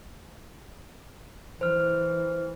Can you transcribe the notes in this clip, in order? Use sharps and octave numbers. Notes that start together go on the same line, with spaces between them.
E3 C5 F6